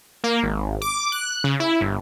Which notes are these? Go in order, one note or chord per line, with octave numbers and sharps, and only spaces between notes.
A#3
G#1
D6
F#6
C#3
E4
G1